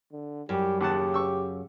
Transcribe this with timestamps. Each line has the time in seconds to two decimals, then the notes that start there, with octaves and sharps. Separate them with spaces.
0.12 D3
0.49 F#2 G3 G4
0.81 D#2 C#3 G4 F#5 A5
1.14 C#6 E6